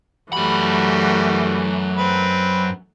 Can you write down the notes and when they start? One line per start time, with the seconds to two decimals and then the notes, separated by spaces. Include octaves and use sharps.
0.33 F#2 E3 G3 A3 F#4 B5
1.97 C4 B4